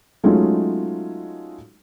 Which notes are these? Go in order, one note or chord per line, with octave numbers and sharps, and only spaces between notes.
F#3 G#3 A3 C#4 D#4 F4